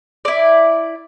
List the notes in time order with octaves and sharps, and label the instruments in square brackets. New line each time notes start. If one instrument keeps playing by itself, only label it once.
[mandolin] E4 D5